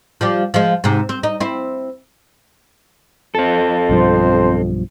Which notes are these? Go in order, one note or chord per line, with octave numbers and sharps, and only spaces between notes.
F3 G3 G4
F3 G#3
G#2 C3
C4
D#4
C4 E4
F2 C4 A4
B1 G2 F3 C5